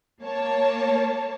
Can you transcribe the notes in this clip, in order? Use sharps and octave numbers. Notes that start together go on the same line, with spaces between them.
A#3 C#5 A5